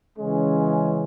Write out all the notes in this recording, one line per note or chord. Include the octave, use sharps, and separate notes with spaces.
C#3 E3 G#3 C#4